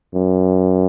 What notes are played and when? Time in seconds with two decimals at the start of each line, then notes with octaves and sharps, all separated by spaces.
0.15 F#2